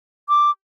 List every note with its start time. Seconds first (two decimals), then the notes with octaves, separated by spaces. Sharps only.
0.29 D6